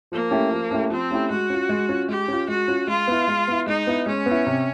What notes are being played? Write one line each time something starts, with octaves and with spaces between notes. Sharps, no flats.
F3 A#3
A3 C#4 E4 G4
F3
A3 C#4 E4 G4
F3 C4
A3 C#4 E4 G4
G#3 F#4
C#4 F4
G#3
C#4 F4
G#3 G4
C#4 F4
G#3 F#4
C#4 F4
G#3 F4
B3 E4
G#3
B3 E4
G#3 D#4
B3 E4
G#3 C#4
B3 E4
C3